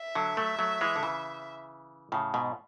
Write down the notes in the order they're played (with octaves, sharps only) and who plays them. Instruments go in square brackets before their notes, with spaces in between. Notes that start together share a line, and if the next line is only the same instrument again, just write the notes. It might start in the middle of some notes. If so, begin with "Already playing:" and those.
Already playing: [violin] E5
[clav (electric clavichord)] D3 F#3
F#3 A3
F#3 A3
E3 G#3
D3
C#3 E3
A2 C#3
G#2 B2